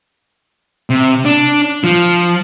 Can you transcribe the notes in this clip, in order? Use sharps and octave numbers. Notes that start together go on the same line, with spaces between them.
C3
D4
F3